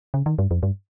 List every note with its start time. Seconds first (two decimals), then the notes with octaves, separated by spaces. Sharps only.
0.14 C#3
0.26 D#3
0.38 G2
0.51 F2
0.63 G2